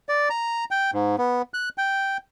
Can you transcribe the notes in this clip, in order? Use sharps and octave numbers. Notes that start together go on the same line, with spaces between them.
D5
A#5
G5
G#2
B3
F#6
G5